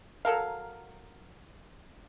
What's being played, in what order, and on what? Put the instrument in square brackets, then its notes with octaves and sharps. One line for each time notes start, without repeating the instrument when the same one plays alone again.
[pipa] F#3 A4 A#4 F5